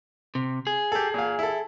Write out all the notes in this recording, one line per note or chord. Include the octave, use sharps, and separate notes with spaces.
C3
G#4
G4 A4
A#2 F5
E4 A4